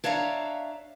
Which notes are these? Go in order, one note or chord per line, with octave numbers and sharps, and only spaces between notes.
D4 C#5 E5 F5 A#5